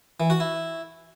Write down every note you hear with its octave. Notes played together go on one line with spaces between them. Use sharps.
E3
F#4
E4